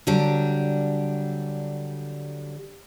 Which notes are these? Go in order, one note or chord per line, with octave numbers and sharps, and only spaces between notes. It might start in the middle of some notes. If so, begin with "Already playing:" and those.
D3 F#3 G3 D4